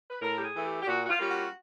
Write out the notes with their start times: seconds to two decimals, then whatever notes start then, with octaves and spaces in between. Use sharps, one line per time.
0.11 B4
0.22 A2 A#4
0.38 G4
0.44 G#4
0.55 E3 A3
0.65 G4
0.82 G4
0.87 A#2 F#4
1.04 F#4
1.09 F4
1.19 G3 A#3 C#4 F4
1.30 F#4